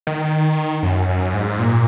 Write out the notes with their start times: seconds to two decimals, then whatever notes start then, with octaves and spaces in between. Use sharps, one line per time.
0.07 D#3
0.83 F#2
1.09 F#2
1.34 G#2
1.59 A#2